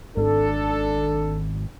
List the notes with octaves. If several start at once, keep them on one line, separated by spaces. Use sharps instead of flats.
G#1 D4 A4